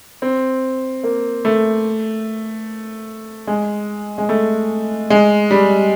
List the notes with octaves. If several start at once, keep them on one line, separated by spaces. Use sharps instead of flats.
C4
A#3
A3
G#3
G#3
A3
G#3
G3